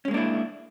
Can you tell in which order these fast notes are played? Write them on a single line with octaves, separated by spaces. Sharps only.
C#4 G#3 A#3 D4 E4